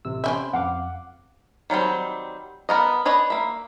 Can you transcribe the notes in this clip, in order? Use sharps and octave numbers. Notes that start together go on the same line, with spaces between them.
A1 C3 E6
C4 C#4 E5 B5
F2 F5 F#5 D6
D#3 F#3 G3 C4
B3 A#4 D#5
D4 B4 C#5 D#5
A#3 E5